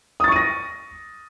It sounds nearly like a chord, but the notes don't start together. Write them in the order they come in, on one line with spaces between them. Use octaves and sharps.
D#6 A6 C#6 D#7 A#6